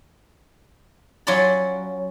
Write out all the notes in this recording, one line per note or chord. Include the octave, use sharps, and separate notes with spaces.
F#3 C#4 F4 D5 B5